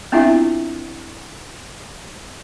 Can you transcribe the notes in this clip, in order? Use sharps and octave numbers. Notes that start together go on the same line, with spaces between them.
B3 C4 D4 E4 F4 E5